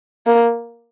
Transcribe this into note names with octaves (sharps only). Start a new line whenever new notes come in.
A#3